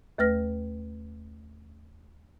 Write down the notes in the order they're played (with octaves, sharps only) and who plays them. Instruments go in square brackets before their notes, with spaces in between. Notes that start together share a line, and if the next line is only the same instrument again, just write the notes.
[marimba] D#2 A3 B4 F6 A#6